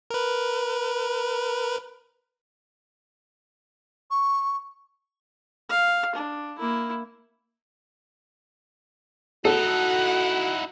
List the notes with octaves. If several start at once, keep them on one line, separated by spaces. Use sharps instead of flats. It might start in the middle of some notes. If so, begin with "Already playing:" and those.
A#4 B4
C#6
F5
D4
A#3 E4
D#4 E4 F#4 A4 F#5